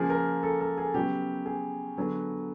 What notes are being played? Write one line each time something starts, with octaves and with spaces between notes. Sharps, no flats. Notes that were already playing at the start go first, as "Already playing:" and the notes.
Already playing: C#3 F3 A#3 G#4
A#4
A4
A4
G#4
C#3 F#3 B3 G4
G#4
D3 F#3 B3